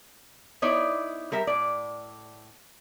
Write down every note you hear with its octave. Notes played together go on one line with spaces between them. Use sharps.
B3 D#4 E4 C#5 D5
G3 A#4 E5
A2 D5